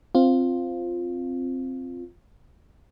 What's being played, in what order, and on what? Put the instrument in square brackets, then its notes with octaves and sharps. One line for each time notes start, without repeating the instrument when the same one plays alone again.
[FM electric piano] C4 F4